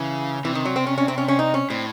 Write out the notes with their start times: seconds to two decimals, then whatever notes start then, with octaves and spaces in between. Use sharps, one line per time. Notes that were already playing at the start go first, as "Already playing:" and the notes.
Already playing: C#3 E3
0.44 C3 E3
0.55 D#3
0.65 F#3
0.76 C4
0.87 C#4
0.98 C#4
1.08 C4
1.18 C#4
1.28 C#4
1.39 D#4
1.54 C#4
1.70 A2 C4